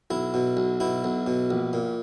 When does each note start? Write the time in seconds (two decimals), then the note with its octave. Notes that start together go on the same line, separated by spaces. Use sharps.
0.11 B1 E4
0.34 B2
0.57 B1
0.80 B2 E4
1.04 B1
1.27 B2
1.50 A#1
1.73 A#2